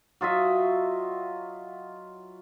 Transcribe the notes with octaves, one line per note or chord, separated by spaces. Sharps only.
F#3 F4 D#5 E5